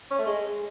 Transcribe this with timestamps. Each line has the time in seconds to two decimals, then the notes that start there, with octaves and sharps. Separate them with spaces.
0.11 C#4
0.19 A3
0.26 G#3